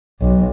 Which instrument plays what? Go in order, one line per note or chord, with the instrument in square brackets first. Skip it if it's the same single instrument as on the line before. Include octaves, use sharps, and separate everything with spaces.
[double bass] B1